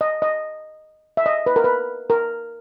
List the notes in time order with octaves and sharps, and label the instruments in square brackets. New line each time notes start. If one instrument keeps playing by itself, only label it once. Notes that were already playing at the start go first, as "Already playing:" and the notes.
[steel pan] D#5
D#5
E5
D#5
B4
A#4
B4
A#4